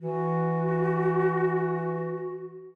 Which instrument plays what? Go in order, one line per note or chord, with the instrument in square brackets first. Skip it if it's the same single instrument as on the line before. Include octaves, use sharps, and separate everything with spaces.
[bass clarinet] E3 [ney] F#4